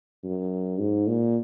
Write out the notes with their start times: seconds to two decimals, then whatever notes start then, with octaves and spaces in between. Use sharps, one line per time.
0.24 F#2
0.79 G#2
1.07 A#2